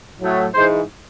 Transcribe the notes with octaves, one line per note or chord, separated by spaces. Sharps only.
A2 F#3 A3
G#2 E3 G#3 C5